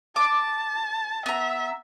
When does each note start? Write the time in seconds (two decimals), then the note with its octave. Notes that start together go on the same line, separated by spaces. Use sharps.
0.16 A5 D6
1.26 B3 E5 A#5